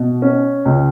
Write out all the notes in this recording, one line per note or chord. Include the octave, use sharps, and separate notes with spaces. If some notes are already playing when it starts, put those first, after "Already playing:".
Already playing: B2
C#4
C#2